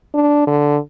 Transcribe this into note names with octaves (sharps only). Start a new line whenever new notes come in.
D4
D3